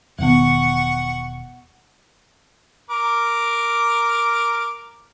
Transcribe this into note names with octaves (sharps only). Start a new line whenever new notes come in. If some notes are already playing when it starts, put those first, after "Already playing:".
E1 B2 D#3 G3 B3 F#5 C#6
A#4 D6